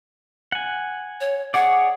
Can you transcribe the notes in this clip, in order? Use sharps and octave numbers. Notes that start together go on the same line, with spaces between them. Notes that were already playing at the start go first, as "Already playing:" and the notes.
F#5 G#5
C#5
G#4 C#5 D5 F#5